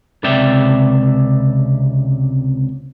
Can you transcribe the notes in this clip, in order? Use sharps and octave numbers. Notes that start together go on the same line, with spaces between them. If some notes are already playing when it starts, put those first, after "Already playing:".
C#2 C3 D5 E5 G5